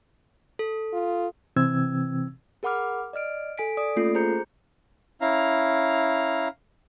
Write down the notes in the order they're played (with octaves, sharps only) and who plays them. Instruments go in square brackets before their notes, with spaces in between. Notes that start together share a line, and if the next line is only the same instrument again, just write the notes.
[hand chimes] A4
[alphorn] F4
[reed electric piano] C3 E3 C4 E6 G#6
[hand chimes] G#4 A#4 F#5 B5 D6 F6
D5 D#5 F6 D7
A4 G#5 B6 D7
D5 D#6 D7
A3 A#3 C#4 F4 A4 C7
G#4 C5 A#5 G6 C#7
[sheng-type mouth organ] C#4 E4 F5 A#5